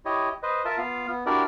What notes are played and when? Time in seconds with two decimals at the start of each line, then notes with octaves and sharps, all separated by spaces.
0.05 E4 G4 C#5 D#5
0.43 B4 C5 D#5
0.65 F4 A#4 E5 A5
0.78 B3 F4 F5
1.07 B3
1.26 D4 E4 F#4 G4 A#4 D5